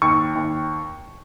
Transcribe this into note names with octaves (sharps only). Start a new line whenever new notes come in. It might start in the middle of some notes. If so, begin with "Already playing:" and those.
D#2 C#6
D#2